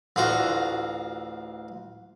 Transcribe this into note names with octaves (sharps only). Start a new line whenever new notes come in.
A1 D2 F4 F#4 A#5